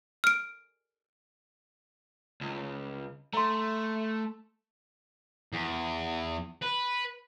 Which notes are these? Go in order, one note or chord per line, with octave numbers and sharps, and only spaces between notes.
F6 D7
C#2
A3 A#5 C6
E2
B4